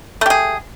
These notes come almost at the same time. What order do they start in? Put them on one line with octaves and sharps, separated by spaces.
A3 G4 G#4